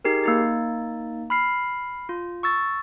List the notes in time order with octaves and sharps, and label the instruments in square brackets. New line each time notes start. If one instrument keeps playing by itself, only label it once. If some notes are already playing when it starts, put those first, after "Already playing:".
[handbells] D#4 G4 G#4 A#4
A#3 D#4 A6
B5 F6 C7
F4
C#6 E6 A6